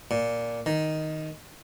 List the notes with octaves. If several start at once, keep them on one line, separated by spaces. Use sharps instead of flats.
A#2
D#3